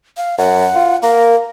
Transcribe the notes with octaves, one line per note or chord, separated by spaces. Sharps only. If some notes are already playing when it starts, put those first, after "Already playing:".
F5
F#2 F#5
F4
A#3 A#4